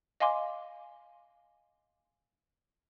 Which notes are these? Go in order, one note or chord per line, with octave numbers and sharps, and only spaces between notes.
D#5 F5 G#5 C6 D6